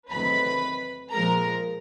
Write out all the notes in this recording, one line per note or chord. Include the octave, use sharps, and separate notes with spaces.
E2 C3 D#3 F#3 A3 B4 B5
A#2 F3 G#3 A#4 A#5